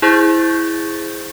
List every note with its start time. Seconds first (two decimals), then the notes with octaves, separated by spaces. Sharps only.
0.02 E4 G#4 C5 C#6 G6 A6